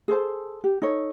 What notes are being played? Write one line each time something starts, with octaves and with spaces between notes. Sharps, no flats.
G#4 A4 C5 A5
G4
D#4 A4 C#5